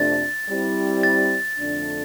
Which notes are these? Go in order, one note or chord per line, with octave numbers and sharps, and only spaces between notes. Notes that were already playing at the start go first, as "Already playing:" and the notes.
Already playing: F2 C3 F3 A3 D4 A6
G3 C4 E4
A6
F2 D3 A3 D4